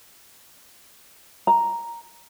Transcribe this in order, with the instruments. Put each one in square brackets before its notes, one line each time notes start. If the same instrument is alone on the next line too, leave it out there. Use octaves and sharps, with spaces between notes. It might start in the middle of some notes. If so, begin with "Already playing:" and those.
[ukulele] A#5